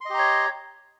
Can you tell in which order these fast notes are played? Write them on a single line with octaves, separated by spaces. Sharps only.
C6 D#5 G4 A#5 C#5